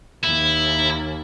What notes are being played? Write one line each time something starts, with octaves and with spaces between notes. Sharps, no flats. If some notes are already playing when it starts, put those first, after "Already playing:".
D#2 E4